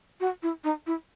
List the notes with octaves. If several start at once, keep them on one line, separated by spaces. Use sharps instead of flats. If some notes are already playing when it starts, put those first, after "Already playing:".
F#4
E4
D#4
E4